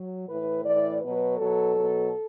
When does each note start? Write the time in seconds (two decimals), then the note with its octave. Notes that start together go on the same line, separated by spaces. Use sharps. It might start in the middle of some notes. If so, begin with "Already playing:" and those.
Already playing: F#3
0.28 A2 E3 B4
0.65 A2 E3 D5
1.01 B2 F#3 B4
1.37 B2 F#3 A4
1.74 B2 F#3